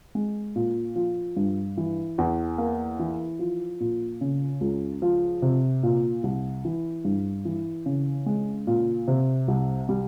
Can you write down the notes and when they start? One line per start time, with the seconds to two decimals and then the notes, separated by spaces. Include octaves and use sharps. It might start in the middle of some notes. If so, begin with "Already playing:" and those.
0.15 G#3
0.56 A#2
0.96 F3
1.36 G2
1.77 E3
2.18 E2
2.58 A#3
2.99 E3
3.39 F3
3.80 A#2
4.21 C#3
4.61 C#2
5.02 F3
5.42 C3
5.83 A#2
6.23 C2
6.65 E3
7.05 G2
7.45 E3
7.86 C#3
8.26 G#3
8.67 A#2
9.08 C3
9.48 C2
9.89 G3